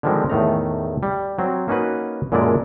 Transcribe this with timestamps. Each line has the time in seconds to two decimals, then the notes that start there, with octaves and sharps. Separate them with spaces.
0.03 D3 D#3 F3 G3 G#3 C4
0.30 E2 A2 D#3 A3 D#4 A#5
1.03 G3
1.39 F#3 C4
1.68 A#3 C#4 D#4 F#4 B4
2.32 F#2 A#2 D3 G#3 E4 D5